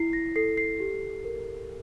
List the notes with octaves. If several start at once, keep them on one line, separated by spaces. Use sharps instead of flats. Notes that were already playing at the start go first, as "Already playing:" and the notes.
Already playing: E4 C7
A#6
A4 C7
C7
G4
A#4